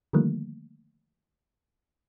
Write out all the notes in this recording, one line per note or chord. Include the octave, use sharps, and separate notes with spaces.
D3 D#3 F3 G3 A3 A#3